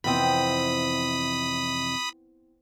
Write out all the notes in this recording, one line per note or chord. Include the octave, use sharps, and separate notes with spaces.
F2 C3 E3 B3 C4 E4 B5 D#6